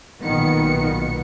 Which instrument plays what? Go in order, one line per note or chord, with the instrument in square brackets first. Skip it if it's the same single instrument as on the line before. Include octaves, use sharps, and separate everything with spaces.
[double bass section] B1 A#2 B3 [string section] D#3 C#7